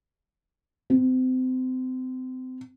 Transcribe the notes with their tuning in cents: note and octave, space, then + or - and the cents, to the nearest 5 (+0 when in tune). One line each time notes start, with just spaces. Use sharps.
C4 -30